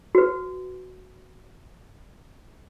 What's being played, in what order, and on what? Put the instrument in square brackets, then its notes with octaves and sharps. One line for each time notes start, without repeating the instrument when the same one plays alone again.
[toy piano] F#4 B4